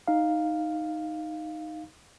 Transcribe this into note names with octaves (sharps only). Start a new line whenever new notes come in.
D#4 F5